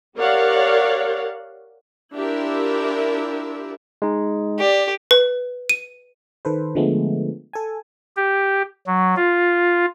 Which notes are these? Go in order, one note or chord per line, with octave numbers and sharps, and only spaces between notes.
G4 A#4 C#5 D5 F5 F#5
D4 E4 F4 G4 A#4 E5
G#3 D#4
G4 D5
B4
D#7
D#3 A4 B4 C5
D3 F3 G#3 A3 B3
A4 G#5
G4
F#3
F4